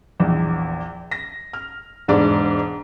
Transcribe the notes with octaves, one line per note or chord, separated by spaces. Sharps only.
A#1 E2
A#6
F6
E1 G#2 D4 D5